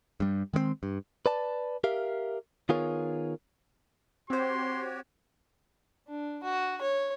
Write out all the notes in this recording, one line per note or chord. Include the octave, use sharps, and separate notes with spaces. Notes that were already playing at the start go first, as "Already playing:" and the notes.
G2 G3
D#3 G#3 A3 C4
G2
B4 D5 A5
G4 A#4 E5 F5
D#3 B3 F4 G#4 A#4 C#5
C4 F#4 G4 C5 C#5 C6
D4
F#4
C#5